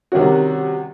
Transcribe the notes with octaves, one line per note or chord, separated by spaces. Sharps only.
C3 D#3 G3 C#4 F#4